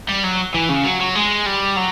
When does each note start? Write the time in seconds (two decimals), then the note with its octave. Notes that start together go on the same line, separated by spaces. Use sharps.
0.09 G3
0.24 F#3
0.54 E3
0.69 C#3
0.85 F#3
1.00 F#3
1.15 G#3
1.46 G3
1.77 F#3